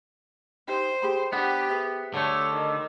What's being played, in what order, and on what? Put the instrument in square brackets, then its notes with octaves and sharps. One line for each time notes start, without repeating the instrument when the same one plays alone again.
[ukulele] D#4 G4 D#5 [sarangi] C5
[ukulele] G4 G#4 B5
[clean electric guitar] B3 [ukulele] D4 C5 F#5 [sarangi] G4
[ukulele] G#4 B4 E5
[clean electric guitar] D3 A3 [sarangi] C#5
[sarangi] D#3